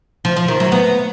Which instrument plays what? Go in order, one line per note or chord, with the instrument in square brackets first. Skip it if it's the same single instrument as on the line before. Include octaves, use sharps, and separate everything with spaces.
[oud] F3
F3
D#3
F#3
B3